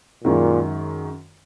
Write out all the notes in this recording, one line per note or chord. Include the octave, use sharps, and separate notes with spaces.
F#2 A#2 D#3 G#3